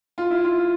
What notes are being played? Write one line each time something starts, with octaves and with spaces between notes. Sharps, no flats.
F4
E4
F4